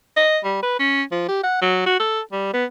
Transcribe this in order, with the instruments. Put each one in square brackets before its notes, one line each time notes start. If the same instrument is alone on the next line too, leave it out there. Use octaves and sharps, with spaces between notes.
[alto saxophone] D#5
G3
B4
C#4
F3
G4
F#5
F#3
F#4
A4
G3
B3